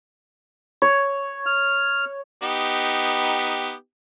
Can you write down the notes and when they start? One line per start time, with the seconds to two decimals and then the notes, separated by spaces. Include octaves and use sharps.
0.82 C#5
1.46 F6
2.43 B3 D#4 G4